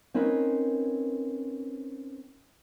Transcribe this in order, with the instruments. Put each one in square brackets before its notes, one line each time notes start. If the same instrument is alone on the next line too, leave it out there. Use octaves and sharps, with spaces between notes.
[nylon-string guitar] C4 C#4 D#4 A#4 B4